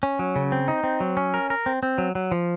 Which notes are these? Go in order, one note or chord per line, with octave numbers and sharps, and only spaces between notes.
C#4
F#3
C#3
C4
D#4
C4
F#3
C#4
A#4
A#4
C4
C4
F#3
F#3
F3